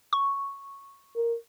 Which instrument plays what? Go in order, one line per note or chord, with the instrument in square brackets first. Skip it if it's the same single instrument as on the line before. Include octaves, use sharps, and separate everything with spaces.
[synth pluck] C#6
[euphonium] A#4